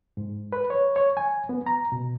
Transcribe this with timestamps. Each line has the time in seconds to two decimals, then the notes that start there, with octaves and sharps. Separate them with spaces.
0.17 G#2
0.53 B4
0.70 C#5
0.96 C#5
1.17 G#5
1.49 B3
1.66 A#5
1.92 B2